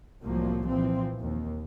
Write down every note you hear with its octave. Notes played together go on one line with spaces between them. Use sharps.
C2 A2 F3 F#3 A#3
A#2 E3 F3 C4
D#2